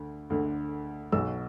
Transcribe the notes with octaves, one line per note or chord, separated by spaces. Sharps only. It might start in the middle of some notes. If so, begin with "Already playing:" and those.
Already playing: D2 D3
D2 D3
B1 B2 E6